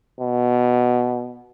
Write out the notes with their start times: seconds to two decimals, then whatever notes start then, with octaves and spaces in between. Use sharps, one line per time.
0.20 B2